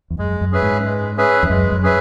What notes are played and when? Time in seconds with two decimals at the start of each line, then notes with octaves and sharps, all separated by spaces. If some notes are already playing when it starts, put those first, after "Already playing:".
0.10 E2
0.19 F#2 G#3
0.41 F#2
0.52 C#4 G#4 B4 E5
0.62 G#2
0.85 G#3
1.17 C#4 G#4 B4 E5
1.43 E2
1.50 F#2 G#3
1.72 F#2
1.83 C#4 G#4 B4 E5